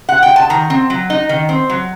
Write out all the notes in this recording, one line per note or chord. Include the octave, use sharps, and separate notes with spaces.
F#5
G5
A5
D#3 A#5
C4
F#3
D#4
D#3
C4
F#3